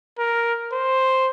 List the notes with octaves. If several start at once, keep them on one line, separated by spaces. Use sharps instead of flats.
A#4
C5